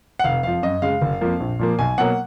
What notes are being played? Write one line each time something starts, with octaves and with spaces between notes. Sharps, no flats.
F#5
F1 F5
F2 F3 F5
F#2 D#5
C#3 G#3 F5
F#1
F2 F3 A#3
A#1
A#2 F3 A#3
B1 G#5
B2 F#3 A#3 F#5